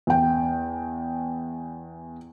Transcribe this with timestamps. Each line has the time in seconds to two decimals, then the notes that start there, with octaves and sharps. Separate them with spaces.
0.07 E2 G5